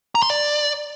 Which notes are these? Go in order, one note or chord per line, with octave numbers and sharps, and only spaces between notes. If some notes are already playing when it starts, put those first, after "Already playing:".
A#5
C6
D5